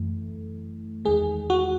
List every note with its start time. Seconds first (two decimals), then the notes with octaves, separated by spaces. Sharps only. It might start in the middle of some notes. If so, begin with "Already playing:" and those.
Already playing: F#2 E3 A3
1.05 E2 D#3 G#3 G#4
1.50 F#4